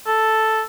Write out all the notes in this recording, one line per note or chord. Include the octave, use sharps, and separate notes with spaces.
A4